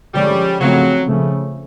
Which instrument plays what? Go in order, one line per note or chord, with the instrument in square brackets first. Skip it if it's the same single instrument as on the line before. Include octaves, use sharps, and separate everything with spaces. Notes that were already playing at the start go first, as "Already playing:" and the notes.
[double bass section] D3 F3 G#3 C#4 [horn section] G3
[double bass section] C#3 F3 A3 C4 [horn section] F#3
[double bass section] C#3 F3 A3 C#4